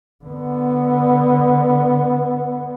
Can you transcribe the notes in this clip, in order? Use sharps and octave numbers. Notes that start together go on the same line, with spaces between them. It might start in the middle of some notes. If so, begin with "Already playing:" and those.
D3 B3